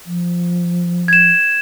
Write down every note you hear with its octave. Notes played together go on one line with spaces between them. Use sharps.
F3
G#6 E7